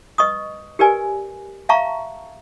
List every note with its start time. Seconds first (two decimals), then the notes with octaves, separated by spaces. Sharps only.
0.18 B4 D#5 C#6 D#6
0.79 G4 A#4 B4 D5 G#5
1.69 E5 F5 A5 A#5 C#6